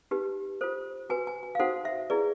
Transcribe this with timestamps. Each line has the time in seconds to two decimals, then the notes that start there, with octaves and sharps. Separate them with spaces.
0.11 D#4 G4 B4
0.61 F4 A4 C5
1.10 F#4 B4 G#5
1.27 G#5
1.43 G#5
1.55 F5
1.59 D#4 F#4 A4 C5 F#5
1.85 E5
2.10 E4 G#4 B4 D5